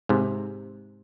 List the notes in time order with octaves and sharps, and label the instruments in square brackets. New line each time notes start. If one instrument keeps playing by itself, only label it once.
[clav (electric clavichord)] G#2 C3